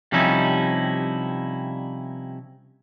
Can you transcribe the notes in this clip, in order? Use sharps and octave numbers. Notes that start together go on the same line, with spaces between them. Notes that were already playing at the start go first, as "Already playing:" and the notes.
C3 F3 G3 C#4 D#4 E4